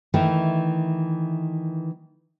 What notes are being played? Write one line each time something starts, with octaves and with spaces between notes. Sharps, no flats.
D#3 E3 A3